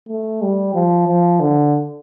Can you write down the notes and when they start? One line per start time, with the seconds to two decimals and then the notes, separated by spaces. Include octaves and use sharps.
0.09 A3
0.42 G3
0.74 F3
1.07 F3
1.40 D3